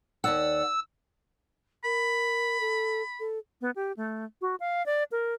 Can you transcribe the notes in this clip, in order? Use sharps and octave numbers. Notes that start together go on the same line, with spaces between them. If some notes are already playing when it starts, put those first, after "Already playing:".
D#2 D5 F#5 E6
A#4 B5
A4
A4
B3
G4
A3
F#4
F5
D5
A#4